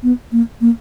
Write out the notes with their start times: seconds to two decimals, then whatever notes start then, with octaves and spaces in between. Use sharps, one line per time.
0.03 B3
0.32 A#3
0.61 A#3